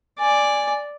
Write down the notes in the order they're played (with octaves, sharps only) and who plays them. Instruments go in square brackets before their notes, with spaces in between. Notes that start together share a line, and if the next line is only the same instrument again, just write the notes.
[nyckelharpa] D5 [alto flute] G#5